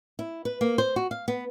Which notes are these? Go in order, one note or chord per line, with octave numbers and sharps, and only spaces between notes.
E4
B4
A#3
C5
F#4
F5
B3